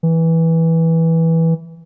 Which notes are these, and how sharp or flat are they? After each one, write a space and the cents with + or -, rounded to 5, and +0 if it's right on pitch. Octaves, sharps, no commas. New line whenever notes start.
E3 -10